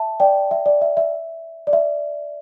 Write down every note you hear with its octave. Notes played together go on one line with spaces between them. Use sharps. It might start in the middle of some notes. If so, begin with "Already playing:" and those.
Already playing: E5 A5
D5 G5
E5
D5
E5
E5
D5
E5